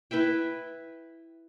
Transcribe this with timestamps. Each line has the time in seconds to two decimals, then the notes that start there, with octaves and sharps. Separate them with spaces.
0.11 E4 B4 E5 G5